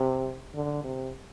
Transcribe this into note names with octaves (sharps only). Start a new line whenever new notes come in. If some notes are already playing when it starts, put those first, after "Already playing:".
Already playing: C3
D3
C3